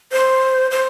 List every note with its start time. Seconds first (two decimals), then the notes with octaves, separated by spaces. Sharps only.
0.12 C5
0.71 C5